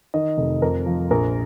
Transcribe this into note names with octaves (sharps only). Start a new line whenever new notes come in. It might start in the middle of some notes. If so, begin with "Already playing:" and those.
D#3 D#5
F1
F2 A#4
F3
A#1 A#4